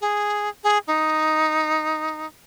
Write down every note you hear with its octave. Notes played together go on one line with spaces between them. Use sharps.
G#4
G#4
D#4